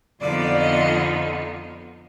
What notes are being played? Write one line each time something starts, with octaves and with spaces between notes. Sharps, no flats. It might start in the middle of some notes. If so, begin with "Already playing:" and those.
F2 D3 F3 B3 D#4 D5
D#5